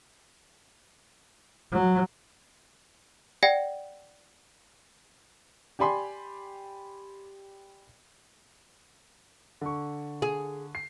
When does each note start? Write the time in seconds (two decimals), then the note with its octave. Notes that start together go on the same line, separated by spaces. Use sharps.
1.72 F#3
3.43 D5 F#5 G5 A#6
5.79 G4 D5 G#5 B5 C6
9.61 D3 C#6
10.22 G#4
10.75 C7